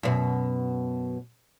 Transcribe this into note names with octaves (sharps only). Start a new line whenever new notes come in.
F#2 B2